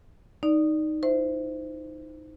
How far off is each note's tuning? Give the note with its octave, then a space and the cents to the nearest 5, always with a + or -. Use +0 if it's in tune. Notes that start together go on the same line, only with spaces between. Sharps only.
D#4 +0 D5 +0
E4 +45 C5 -15 E5 +0